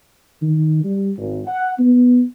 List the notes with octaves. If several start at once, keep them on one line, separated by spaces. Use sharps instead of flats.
D#3
G3
G#1
F#5
B3